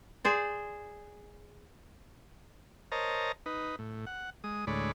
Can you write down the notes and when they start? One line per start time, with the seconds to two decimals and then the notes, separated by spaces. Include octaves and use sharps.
0.24 G#4 C5 D5
2.92 A#4 C5 C#5 D#5 A5 A#5
3.46 D#4 B4
3.79 A2
4.07 F#5
4.44 G#3 D#6
4.67 D2 A2 G#3 C#5 D5 B5